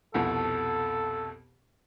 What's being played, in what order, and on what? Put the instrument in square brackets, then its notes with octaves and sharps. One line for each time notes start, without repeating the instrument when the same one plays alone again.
[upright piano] C2 F2 B2 [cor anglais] A4